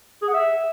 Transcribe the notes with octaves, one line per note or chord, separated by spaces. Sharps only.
G#4
F#5
E5